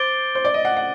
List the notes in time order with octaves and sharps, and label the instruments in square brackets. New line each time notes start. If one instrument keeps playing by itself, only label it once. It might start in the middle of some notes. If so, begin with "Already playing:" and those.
Already playing: [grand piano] C5 [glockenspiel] D6 A6 D7 G7
[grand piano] C5
D5
D#5
F#5
F#5